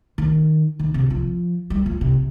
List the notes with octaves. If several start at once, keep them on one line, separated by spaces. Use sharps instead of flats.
D#3
D#3
C3
F3
G3
F3
C3